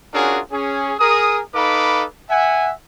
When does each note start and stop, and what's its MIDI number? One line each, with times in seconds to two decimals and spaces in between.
0.14 0.40 61
0.14 0.40 62
0.14 0.40 65
0.14 0.40 66
0.14 0.40 68
0.14 0.40 70
0.51 0.94 61
0.51 0.94 68
1.00 1.40 68
1.00 1.40 70
1.00 1.40 87
1.55 2.05 63
1.55 2.05 69
1.55 2.05 71
1.55 2.05 77
1.55 2.05 83
1.55 2.05 86
2.29 2.72 76
2.29 2.72 78
2.29 2.72 80